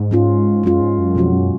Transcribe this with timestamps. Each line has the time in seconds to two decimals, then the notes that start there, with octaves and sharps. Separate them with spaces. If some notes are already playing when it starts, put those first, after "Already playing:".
Already playing: G#2
0.11 G#3 C#4 F4
0.63 F#2 G#3 C#4 F4
0.81 G#2
0.98 F#2
1.15 F2 B2 F#3 C#4 F#4
1.33 F#2